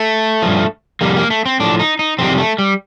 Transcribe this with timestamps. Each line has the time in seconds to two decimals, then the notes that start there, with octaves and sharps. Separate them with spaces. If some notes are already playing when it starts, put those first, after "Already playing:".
Already playing: A3
0.42 G2 F3
1.01 F2 C3 G3 A#3
1.17 A#3
1.30 A3
1.46 C4
1.60 A2 F3 D4
1.79 D#4
1.99 D#4
2.19 F2 C3 D#3 G3 C4
2.38 A3
2.58 G3